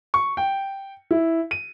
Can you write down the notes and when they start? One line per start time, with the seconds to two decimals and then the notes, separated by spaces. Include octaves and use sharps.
0.14 C#6
0.37 G5
1.11 E4
1.51 D#7